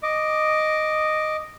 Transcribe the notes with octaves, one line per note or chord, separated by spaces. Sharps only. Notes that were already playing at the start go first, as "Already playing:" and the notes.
D#5 D6